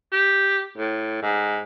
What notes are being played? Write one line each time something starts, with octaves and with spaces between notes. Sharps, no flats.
G4
A2
G#2